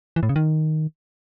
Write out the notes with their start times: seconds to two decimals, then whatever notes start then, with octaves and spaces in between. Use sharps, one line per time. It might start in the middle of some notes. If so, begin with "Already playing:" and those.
0.16 E3
0.23 A2
0.29 C#3
0.36 D#3